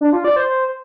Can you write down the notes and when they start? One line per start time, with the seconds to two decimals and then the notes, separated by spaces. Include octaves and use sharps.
0.01 D4
0.13 F4
0.24 D5
0.36 C5